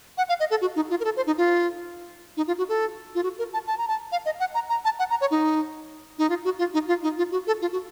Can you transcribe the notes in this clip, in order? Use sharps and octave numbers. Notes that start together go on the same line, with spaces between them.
F#5
F5
D#5
A4
F#4
D#4
F4
A#4
A4
C5
D#4
F4
D#4
F4
F#4
A4
F4
F#4
A#4
A5
A5
A#5
A5
F5
D#5
F#5
A#5
A#5
A5
F#5
A#5
C#5
D#4
D#4
F4
F#4
F4
D#4
F4
D#4
F4
F#4
A4
F4
F#4